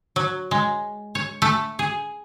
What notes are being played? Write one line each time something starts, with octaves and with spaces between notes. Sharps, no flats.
F#3
G#3
C#5
A3
G#4